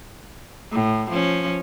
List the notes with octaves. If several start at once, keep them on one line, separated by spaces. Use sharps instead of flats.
A2
F3 C#4